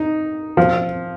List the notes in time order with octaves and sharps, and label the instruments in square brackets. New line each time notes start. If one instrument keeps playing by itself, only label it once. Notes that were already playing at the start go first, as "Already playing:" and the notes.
Already playing: [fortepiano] D#4
F3